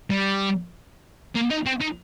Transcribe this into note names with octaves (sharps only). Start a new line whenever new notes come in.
G3
A#3
D#4
C4
D#4